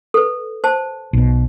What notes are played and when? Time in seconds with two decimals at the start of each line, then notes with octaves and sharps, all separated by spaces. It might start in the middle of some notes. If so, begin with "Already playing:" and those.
0.14 A4 B4
0.64 C5 A5
1.13 B1 B2